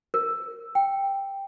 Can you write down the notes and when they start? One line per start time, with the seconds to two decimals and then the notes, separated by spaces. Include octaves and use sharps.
0.14 A#4
0.75 G5